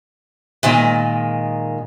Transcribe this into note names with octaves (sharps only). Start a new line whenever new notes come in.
A#2 D#3 G#3